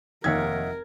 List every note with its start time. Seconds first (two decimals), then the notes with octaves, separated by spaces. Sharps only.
0.24 F1 D#2 D#3 A#4 D#5 E5 F#5 G#6